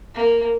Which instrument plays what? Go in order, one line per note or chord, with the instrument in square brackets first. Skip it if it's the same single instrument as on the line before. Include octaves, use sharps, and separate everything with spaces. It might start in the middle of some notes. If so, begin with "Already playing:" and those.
[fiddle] A#3